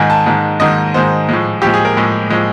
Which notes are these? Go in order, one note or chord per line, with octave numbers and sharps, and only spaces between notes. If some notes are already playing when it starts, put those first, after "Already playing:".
Already playing: G#2 D#3 G#3 G#5
A5
G#2 D#3 G#3
G#2 D#3 G#3 D#5
G#2 D#3 G#3 C5
A2 F3 G#3
A2 F3 G#3 G4
G#4
A#4
A2 F3 G#3
A2 F3 G#3